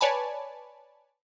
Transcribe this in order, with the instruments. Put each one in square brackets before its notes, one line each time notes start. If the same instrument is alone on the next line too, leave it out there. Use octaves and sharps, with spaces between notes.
[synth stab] B4 C#5 D5 G#5 A5 B5